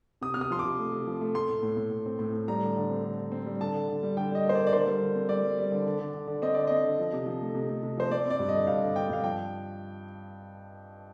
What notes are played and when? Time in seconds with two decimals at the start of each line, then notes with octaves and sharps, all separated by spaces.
0.21 C3 D#6
0.34 C3 F6
0.41 D#6
0.50 F3 C6
0.59 D6
0.65 C3
0.79 A3
0.92 C3
1.07 F3
1.21 A3
1.35 A3 C6
1.49 A2
1.63 A2
1.77 A2
1.91 A2
2.06 C4
2.19 A2
2.33 A2
2.48 G3 A#5
2.62 D3
2.76 D3
2.89 C4
3.04 D3
3.18 D3
3.32 C4
3.46 G3
3.61 D3 A5
3.74 D3
3.88 D3
4.03 G3
4.17 D3 G5
4.31 G3 D#5
4.45 A#3
4.49 C5
4.55 D5
4.58 A#3
4.67 D5
4.73 D3 C5
4.87 G3
5.02 D3
5.15 C4
5.29 G3 D5
5.43 G3
5.58 G3
5.72 D3
5.86 D3
5.99 D3
6.14 D3
6.27 D3
6.42 C4 D#5
6.54 D3 D5
6.67 C4 D#5
6.85 D3
6.99 F3
7.13 C3
7.26 F3
7.41 A3
7.55 C3
7.69 A3
7.83 C3
7.97 F3 C5
8.11 C4 D5
8.26 C4 D5
8.39 G2
8.49 D#5
8.54 D3
8.67 G2 F5
8.82 D3
8.96 C4 G5
9.10 G2 F5
9.24 F3 G5